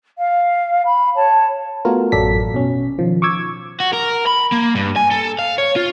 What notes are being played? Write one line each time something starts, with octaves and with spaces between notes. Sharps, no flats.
F5
B5
C#5 A5
A3 B3 F4 F#4 A#4
A1 F#2 F#3 A4 D5 B6
B2 C#4
D#3 F3
C#6 D6 E6 G#6
F#4
A#4
B5
A#3
G2
G#5
A4
F5
C#5
F4